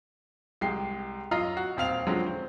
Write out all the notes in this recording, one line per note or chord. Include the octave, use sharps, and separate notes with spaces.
C2 G#3 G4 G5 C7
F#2 F4 D#5 A#5 F6 C7
F#4
D#1 C4 F5 F7
D3 F3 F#3 G#3 C4 C#4
C5